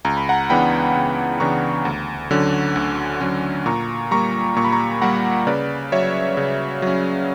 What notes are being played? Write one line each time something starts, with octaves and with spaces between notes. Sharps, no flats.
C#2 A#5
B5
F#5 A#5
C#3 E3 B3 D4 G5 B5
C#2
C#3 E3 B3 D4 A#5 C#6
D2
D3 F#3 C#4
D2
D3 F#3 C#4
A#2 A#5 C#6
G3 A#3 A#5 C#6
A#2 C#6
B5
A#5 C#6
G3 A#3 F#5 A#5
C#3 B4 D5
F#3 C#4 C#5 E5
C#3
F#3 C#4